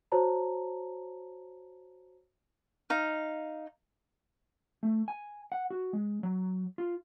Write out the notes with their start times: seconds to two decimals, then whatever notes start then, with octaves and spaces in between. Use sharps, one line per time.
0.12 F#4 C5 C#5 A5 A#5
2.90 D#4 F5
4.83 A3
5.08 G#5
5.52 F#5
5.70 F#4
5.93 G#3
6.23 F#3
6.78 F4